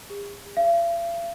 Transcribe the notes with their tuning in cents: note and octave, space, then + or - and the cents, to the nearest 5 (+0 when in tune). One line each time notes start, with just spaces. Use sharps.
G#4 -40
F5 -45